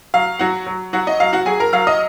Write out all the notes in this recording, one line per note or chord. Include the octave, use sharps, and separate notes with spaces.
F#3 F5
F#3 F#4 F#5
F#3
F#3 F#4 F#5
D#5
F#3 F5
F#4 F#5
F#3 G#4 G#5
A#4 A#5
F#3 F5 F6
D#5 D#6